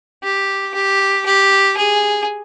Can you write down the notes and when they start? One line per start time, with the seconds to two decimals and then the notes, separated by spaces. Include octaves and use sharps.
0.24 G4
0.75 G4
1.26 G4
1.78 G#4